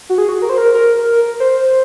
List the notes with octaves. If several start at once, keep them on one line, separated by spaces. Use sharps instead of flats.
F#4
G#4
F#4
A#4
C5
A#4
A#4
C5